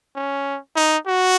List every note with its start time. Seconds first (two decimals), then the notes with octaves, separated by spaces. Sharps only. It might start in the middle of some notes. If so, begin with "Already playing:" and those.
0.15 C#4
0.76 D#4
1.07 F#4